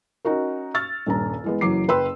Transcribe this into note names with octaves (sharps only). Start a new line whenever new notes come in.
C#4 D#4 F#4 A#4
C#6 E6 F6 A6
D#1 G2 A#5
E3 G#3 B3
F#1 E3 F#3 D6 C7
F#1 B4 G5 C6 E6